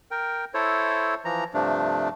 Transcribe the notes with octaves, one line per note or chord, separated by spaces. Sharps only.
A#4 G5
E4 A4 C5 C#5
E3 F3 A#5
G2 C3 F3 A3 D4